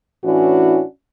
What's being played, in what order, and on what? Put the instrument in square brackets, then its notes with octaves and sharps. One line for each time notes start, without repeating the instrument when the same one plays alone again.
[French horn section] A2 E3 C#4 D4 E4 F#4